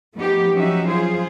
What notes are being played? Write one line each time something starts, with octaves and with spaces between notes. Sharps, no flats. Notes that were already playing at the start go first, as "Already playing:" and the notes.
F3 A3 B3 D#4 G4
F3 F#3 C#4 D#4 F#4 E5
F4 G#4 C5